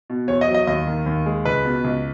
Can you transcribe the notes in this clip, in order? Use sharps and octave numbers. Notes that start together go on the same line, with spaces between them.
B2
E2 C#5
D#5
F#3
D#5
D#2 D#5
D#3
D#2
G#3
C#2 B4
B2
C#2